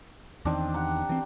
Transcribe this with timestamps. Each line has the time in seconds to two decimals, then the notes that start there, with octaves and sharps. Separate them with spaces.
0.45 E2 D#3 C4 D4 D6
0.74 G4 F#5 A#5
1.09 E3 C4